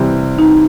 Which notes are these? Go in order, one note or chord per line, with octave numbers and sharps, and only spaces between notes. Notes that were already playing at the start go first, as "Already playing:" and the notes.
Already playing: C3 E3 G3 C4
D#4